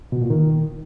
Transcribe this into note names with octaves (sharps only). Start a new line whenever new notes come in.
B2
A#2
D#3